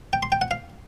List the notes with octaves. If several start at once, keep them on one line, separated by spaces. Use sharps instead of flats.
G5
C6
G5
F#5
F5